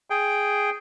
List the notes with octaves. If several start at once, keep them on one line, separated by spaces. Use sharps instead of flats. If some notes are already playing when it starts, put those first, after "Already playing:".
G#4 G5